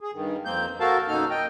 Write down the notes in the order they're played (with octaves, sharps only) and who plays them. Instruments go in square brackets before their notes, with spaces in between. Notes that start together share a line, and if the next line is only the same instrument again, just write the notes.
[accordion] G#4
G2 D#3
F2 A#3 C4 G6
F#4 A4 A#4 F5 A5
F#2 B2 A#3 D#4 A4 F6
D#5 G5